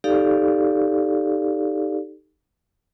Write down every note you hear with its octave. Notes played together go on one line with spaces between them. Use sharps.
D#4 G4 A4 D5 F5